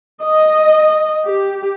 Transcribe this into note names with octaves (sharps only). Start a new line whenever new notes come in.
D#5
G4